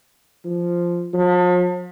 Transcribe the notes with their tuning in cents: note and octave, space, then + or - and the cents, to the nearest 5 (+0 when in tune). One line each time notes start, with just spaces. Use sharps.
F3 -5
F3 +40